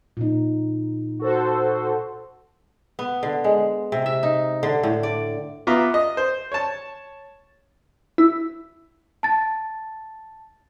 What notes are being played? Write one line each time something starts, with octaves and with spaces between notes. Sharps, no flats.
A#2 D#4
F#4 A4 C5
B3
D3
G#3
C3
E5
D#4
D3
A2
D5
B3 F4 E5 A#5 D6
D#5
C5
C#5 A5
E4
A5 A6